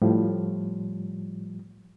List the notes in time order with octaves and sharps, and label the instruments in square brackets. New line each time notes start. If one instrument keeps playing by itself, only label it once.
[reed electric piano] A2 F3 G3